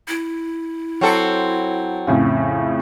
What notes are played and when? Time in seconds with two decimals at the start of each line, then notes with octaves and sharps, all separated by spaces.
0.08 E4
1.01 F#3 C4 A4
2.07 F2 A2 C#3